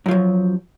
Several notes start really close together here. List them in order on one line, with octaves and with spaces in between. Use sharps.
F#2 F3 F#3